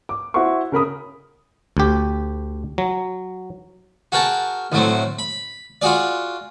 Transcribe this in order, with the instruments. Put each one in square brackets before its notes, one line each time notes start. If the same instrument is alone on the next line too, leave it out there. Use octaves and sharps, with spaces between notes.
[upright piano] D6
E4 F#4 C5 F#5 C6 C#6
C#3 A#4 B5 D#6
[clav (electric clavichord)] D2 G4
F#3
[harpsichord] F#4 G#4 A#4 G5 A5
D2 A2 F#3 A3 C4
B5
F4 F#4 G#4 D5